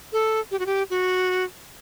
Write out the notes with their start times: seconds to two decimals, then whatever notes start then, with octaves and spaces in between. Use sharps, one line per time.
0.13 A4
0.51 G4
0.59 F#4
0.66 G4
0.90 F#4